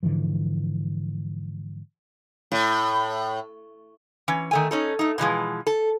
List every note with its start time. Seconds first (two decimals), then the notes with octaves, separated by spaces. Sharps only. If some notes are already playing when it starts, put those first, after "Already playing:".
0.03 G#2 D3 E3 F3
2.52 A2
4.28 E3 C#4
4.51 D#3 A3 G#5
4.71 C#4 D#4 A4
4.99 A3 D#4
5.18 B2 E3 F3 G#3
5.67 A4